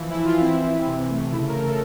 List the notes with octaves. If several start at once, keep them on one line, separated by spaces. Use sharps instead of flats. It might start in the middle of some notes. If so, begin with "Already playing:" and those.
Already playing: E3 F3
E4
E3
F4
C4 E4
E3
C3
A3
C#3 E4
A#4
C#3
A4